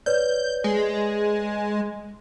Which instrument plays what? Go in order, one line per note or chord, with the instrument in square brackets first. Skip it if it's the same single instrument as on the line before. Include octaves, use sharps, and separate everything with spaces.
[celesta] B4 C#5 D5 [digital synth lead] G6
[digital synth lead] G#3